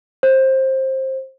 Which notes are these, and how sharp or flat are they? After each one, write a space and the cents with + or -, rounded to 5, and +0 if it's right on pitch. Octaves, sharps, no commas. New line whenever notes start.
C5 +20